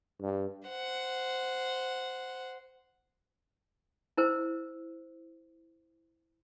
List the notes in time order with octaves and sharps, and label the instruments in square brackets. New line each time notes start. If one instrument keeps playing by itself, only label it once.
[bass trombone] G2
[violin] C5 F#5
[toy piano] E4 A#4 C5